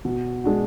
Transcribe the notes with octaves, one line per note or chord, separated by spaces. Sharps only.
B2
G#3 D4 F#4